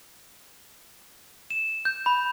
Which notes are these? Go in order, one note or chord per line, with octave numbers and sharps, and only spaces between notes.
E7
G6
B5